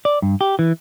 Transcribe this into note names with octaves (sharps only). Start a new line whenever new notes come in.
D5
G2
G4
E3